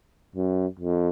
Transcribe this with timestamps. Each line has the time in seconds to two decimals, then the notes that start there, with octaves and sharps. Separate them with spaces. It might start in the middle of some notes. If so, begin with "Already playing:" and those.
0.36 F#2
0.80 F2